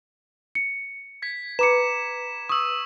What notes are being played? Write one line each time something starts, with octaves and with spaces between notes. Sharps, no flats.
C#7
G#6 B6
B4 A#5 D6 C#7 E7
C#6 D#6 E6